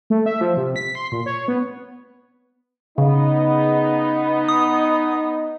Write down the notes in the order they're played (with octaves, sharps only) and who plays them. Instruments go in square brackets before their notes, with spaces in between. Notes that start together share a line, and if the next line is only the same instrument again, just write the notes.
[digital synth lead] A3
E5
F3
C3
B6
C6
A#2
C#5
B3
[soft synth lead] C#3 [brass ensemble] B3 D#4
[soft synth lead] D#6